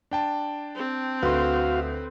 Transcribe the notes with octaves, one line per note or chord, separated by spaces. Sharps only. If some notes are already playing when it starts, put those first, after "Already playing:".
D4 G5 A5
C4
D2 F#4 B4 F5 C6